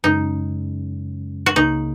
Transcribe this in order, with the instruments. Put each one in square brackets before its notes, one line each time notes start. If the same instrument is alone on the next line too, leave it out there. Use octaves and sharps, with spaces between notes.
[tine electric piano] F#2 C#3 G#3 C#4 [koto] D#4
[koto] F#4
[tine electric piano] C#2 C#3 A#3 [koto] D#4